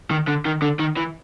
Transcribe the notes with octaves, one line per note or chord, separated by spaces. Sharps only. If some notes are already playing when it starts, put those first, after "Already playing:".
D#3
D3
D#3
D3
D#3
E3